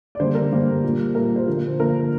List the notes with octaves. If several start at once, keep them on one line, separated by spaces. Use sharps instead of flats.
D5
D3 G3 A#3 C5
A#4
D3 G3 A#3
A#2 G3 A#3
A#2 G3 A#3 A#4
C5
D3 F3 A#3
D3 F3 A#3 A#4